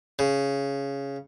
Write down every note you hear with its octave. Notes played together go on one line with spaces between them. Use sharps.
C#3